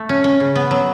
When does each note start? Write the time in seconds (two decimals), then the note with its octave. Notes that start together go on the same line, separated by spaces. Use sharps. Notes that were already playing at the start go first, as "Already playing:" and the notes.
Already playing: A3
0.09 C#4
0.24 C#4
0.40 C#3
0.56 B3
0.71 F#3